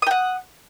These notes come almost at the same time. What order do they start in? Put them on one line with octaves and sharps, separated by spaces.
D#6 G5 F#5